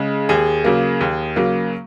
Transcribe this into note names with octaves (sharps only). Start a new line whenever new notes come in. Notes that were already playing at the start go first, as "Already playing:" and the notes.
Already playing: C#3 G#3
D#2 G#4
C#3 F#3 A#3
D#2
C#3 F#3 A#3